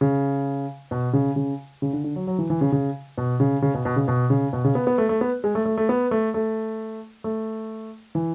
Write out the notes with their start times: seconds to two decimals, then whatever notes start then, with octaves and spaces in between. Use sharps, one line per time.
0.01 C#3
0.91 B2
1.13 C#3
1.36 C#3
1.82 C#3
1.93 D3
2.04 D3
2.16 F#3
2.27 F#3
2.38 E3
2.50 E3
2.61 C#3
2.72 C#3
3.18 B2
3.40 C#3
3.62 C#3
3.74 B2
3.85 B2
3.96 C#3
4.08 B2
4.30 C#3
4.53 B2
4.64 C#3
4.75 B3
4.87 B3
4.98 A3
5.09 A3
5.21 B3
5.44 G#3
5.55 A3
5.66 A3
5.77 A3
5.89 B3
6.11 A3
6.34 A3
7.24 A3
8.15 E3